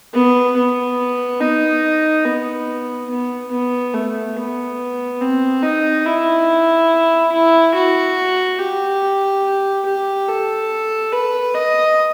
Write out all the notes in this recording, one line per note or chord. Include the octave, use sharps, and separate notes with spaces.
B3
B3
D#4
B3
B3
B3
A3
B3
C4
D#4
E4
E4
F#4
G4
G4
A4
B4
D#5